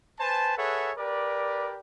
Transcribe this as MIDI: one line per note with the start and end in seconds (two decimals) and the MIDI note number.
0.19 0.54 71
0.19 0.54 72
0.19 0.54 80
0.19 0.54 81
0.57 0.91 68
0.57 0.91 69
0.57 0.91 71
0.57 0.91 73
0.57 0.91 76
0.57 0.91 78
0.98 1.79 67
0.98 1.79 70
0.98 1.79 71
0.98 1.79 74